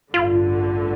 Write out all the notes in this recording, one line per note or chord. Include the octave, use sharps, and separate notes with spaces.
A1 G2 D3 F4